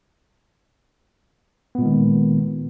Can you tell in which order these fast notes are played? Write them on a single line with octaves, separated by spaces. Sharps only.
B3 A#2 G#3 D#3